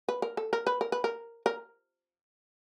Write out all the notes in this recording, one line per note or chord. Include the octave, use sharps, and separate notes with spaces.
B4
A#4
A4
A#4
B4
A#4
B4
A#4
A#4